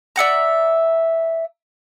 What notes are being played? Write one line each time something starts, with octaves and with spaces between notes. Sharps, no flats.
D5 E5 F#5 A#5